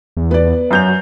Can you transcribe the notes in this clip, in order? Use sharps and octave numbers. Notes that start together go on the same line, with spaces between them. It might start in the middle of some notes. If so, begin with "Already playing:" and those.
E2
B3 D5
F#2 F#3 G6 F7